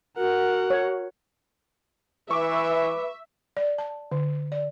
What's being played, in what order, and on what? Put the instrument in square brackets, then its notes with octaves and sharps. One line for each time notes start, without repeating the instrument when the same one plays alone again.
[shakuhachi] F#4 [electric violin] A#4 F#5
[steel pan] C#5
[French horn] E3 [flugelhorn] B4 [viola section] E5 [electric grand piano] C#6 D6
[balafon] D5
A5
D3
D5